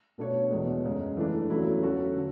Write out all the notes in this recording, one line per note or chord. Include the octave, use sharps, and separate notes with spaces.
B2 A3 D4 A4 C#5
E2 B2 G#3
F#2 C#3 G#3
E3 A3 D4
E2 C#3 F#3 A3 E4
F#3 C#4 F#4 A4
D3